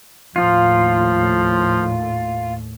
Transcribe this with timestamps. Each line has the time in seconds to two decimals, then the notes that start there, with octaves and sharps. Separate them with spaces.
0.36 D#2 A2 F3 F4